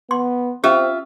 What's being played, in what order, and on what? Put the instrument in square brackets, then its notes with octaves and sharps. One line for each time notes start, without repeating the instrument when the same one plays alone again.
[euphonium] B3 [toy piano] C6
[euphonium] C4 [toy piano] C#4 G4 [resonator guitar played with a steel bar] F4 E5